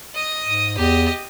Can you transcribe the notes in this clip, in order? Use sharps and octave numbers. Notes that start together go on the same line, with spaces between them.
D#5 D#6
G#2
E2 G4 D#5